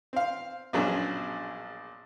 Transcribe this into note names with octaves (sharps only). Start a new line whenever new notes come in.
C4 F5
A#1 G2 B2 F#3 C#4 G#4